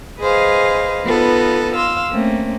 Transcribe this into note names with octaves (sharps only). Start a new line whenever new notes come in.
G#4 B4 C5 D#5 F5 G#5
B3 D#4 F4 A4 B4
F5 C6 E6
A3 A#3 C4 C#4